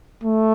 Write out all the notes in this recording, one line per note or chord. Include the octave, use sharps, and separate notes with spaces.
A3